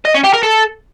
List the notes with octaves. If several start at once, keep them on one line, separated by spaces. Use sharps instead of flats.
D#5
C#4
G4
A#4
A4